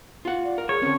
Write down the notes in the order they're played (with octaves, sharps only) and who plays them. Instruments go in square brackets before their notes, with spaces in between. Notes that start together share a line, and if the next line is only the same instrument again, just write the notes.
[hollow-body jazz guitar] F4 F#5
[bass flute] D5
[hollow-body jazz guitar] A#4 [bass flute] F5
[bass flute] G#4 [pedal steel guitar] C#5
[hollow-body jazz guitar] D3 C#4 [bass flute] C4